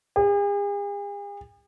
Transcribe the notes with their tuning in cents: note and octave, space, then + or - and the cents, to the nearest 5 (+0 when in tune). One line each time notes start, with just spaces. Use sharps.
G#4 -45